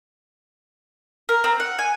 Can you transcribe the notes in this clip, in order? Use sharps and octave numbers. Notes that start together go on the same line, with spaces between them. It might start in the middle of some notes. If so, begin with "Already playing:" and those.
A#4
C4
F#5
G#5